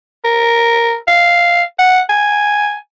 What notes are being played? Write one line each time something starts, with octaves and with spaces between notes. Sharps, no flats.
A#4
F5
F#5
G#5